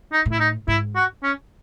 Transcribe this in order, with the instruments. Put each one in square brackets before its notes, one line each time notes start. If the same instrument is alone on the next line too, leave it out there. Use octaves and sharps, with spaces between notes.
[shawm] D#4
[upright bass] A2
[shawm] E4
D#4
[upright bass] G#2 [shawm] E4
[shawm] F#4
C#4